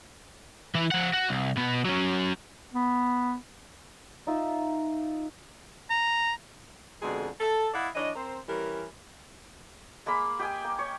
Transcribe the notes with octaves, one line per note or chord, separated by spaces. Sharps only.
E3 E4
F3 F#5
F#4
C2
B2 B3
F#3 C#4
B3
D#4 F4 E5
A#5
F2 B2 D3 G#3 G#4
A4
E4 D5 D#5 F5 F#5
E3 D4 C#5 D#5
C4 A#4 C5
E3 G3 C#4 A#4
G#3 A#3 F5 B5
G4 D#5 G5 G#5
A#3
C#5